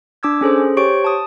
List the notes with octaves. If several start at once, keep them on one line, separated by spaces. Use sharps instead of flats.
D4 D6 E6 G#6
C#4 G#4 A4 C5
G4 C5 C#5 C#6 D7
A5 D#6